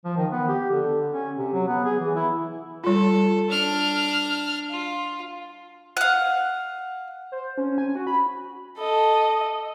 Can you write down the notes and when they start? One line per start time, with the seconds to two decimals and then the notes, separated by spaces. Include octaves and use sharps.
0.05 F3
0.17 D#3
0.32 B3
0.48 G4
0.71 D3
1.13 C#4
1.38 C3
1.53 F#3
1.68 B3
1.84 G#4
1.99 E3
2.15 E4
2.84 G3 F4 A4
3.49 D4 F6
4.70 F4
5.97 F5 F#5
7.32 C5
7.58 C#4
7.78 G#5
7.95 F#4
8.07 B5
8.78 A4 D#5